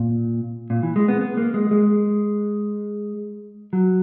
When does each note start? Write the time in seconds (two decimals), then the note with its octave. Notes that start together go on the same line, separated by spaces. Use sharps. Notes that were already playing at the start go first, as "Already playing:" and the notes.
Already playing: A#2
0.70 A#2
0.83 E3
0.96 G#3
1.08 B3
1.21 B3
1.37 A#3
1.54 G#3
1.71 G#3
3.73 F#3